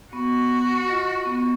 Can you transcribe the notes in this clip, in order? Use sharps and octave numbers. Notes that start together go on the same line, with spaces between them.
B3 F#4
F4 D#5
B3 C#6